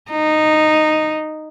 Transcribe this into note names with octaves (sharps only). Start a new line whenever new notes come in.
D#4